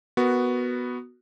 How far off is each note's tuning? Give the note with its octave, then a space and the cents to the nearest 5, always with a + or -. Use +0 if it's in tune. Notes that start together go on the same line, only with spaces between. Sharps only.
B3 +0 F#4 +0 A#4 +0